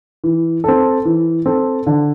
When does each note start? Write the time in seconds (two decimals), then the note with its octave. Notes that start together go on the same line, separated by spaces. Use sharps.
0.24 E3
0.64 C4 A4
1.05 E3
1.46 C4 A4
1.87 D3